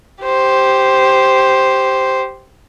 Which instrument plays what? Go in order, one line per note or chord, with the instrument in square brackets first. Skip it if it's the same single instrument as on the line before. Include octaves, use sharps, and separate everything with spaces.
[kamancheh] G4 C5